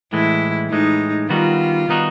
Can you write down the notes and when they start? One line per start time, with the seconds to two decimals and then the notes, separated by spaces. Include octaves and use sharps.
0.13 A2 E3 G#3 E4
0.71 A2 E3 G#3 D#4
1.29 D#3 G3 B3 D#4 F4 F#4
1.88 D#3 G3 B3 D#4 F#4